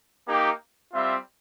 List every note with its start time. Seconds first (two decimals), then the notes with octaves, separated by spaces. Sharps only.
0.27 A#3 D#4 G4
0.93 G3 C4 F4 E5